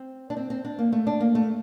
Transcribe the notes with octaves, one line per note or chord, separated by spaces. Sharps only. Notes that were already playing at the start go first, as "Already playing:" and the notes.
Already playing: C4
D4
C4
C4
D4
A#3
A3
D4
A#3
A3